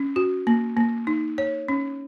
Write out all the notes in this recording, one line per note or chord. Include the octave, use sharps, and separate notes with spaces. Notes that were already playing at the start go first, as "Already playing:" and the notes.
Already playing: C#4
F#4
A#3
A#3
D#4
C#5
C#4